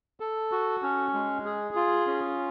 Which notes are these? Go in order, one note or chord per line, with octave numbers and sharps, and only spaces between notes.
A4
F#4
C#4
G#3
G#4
F4
C#4